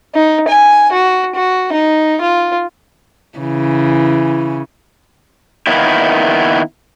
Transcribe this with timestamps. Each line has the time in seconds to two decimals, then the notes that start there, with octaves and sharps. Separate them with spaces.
0.15 D#4
0.48 G#5
0.93 F#4
1.35 F#4
1.73 D#4
2.22 F4
3.38 C#3 E3
5.67 D#3 A#3 B3 E4